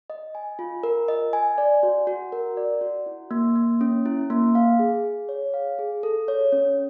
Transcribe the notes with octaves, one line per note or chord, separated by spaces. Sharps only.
D#5
G#5
F4
A#4
D#5
G#5
D5
F#4
F#4
A#4
D5
F#4
E4
A#3
A#3
C#4
E4
A#3
F5
G#4
G#4
C#5
F5
G#4
A4
C#5
C#4